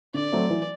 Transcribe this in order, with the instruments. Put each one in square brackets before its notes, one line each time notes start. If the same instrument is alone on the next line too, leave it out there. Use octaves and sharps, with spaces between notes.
[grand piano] D3 [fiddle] D5
[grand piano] F#3 A3 C4
E3